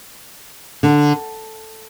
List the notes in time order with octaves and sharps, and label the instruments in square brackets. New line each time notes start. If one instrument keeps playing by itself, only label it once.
[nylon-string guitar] D3